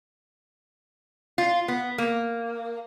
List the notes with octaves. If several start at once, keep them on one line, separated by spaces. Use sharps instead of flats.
F4
B3
A#3